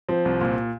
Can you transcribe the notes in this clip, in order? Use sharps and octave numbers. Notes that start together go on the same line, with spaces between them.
F3 C4
C2
A#2